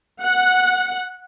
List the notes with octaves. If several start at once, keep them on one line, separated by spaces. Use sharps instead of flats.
F#5